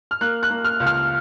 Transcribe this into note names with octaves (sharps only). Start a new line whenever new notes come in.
F6
A#3 F#6
F#6
A#3
F6
C#2
F6